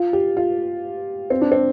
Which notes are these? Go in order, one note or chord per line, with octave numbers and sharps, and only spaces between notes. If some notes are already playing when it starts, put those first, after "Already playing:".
Already playing: F4
G4
F4
C4
D4
C4